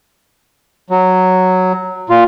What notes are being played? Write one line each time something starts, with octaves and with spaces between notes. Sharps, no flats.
F#3
A#2 F4